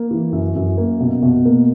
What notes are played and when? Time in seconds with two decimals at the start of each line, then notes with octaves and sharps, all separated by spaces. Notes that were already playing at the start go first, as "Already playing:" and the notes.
Already playing: A#3
0.11 E3
0.33 F#2
0.56 F#2
0.78 A#3
1.00 B2
1.23 B2
1.45 A#3